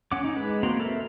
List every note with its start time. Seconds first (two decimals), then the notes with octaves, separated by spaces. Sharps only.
0.12 C#4 F#5 D6
0.23 C#4 D#4
0.36 G#3 B4
0.63 A#3 C4 F#4 A#5 C6
0.80 A4 A#4 E5